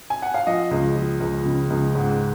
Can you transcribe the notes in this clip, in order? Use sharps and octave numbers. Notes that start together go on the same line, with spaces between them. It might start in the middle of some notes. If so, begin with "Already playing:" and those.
G#5
F#5
F5
F3 D#5
C#2
F3
C#2
C#3
C#2
G#2